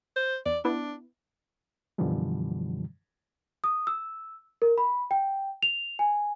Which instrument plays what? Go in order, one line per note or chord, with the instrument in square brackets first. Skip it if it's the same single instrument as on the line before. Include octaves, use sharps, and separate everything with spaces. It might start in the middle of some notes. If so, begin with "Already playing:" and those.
[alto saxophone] C5
[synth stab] E2 [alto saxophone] D5
[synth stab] B3 E4 [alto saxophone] D4
[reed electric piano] F#2 B2 D3 E3 F3 G3
[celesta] D#6
E6
A#4
B5
G5
F7
G#5